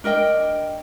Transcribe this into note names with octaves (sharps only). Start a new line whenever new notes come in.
D4 A#4 D#5 G5